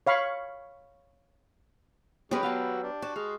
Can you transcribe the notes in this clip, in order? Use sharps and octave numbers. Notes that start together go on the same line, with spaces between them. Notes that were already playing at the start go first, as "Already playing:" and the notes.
C#5 F5 B5 C#6
F#3 G#3 B3 C#4 G4 A#4 B4
F#4 F5 G5 A5 E6
D4
F#4 A5
G#3 F5